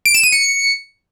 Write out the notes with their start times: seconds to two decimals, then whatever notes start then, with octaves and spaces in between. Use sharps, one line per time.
0.06 D7
0.14 E7
0.23 D#7
0.32 C#7